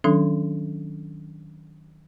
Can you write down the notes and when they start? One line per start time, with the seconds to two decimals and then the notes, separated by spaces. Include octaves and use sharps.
0.04 D#3 F#3 C#4 D4 A4